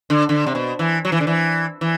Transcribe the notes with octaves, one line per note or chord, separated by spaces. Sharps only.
D3
D3
C3
B2
E3
F#3
E3
D3
E3
E3